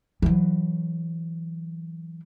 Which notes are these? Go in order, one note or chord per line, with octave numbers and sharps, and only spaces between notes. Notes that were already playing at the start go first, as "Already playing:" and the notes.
E3 F#3